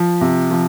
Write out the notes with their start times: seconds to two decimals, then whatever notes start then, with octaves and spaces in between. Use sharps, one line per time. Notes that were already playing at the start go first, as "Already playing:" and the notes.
Already playing: F3
0.21 C3
0.51 F3